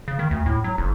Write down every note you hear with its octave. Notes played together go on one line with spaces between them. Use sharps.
C#3
D#3
D2
A2
F#3
F#1